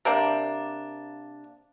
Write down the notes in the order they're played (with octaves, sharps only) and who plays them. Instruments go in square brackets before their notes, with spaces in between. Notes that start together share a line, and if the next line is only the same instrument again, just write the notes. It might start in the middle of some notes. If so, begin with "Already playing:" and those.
[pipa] C3 A#3 D4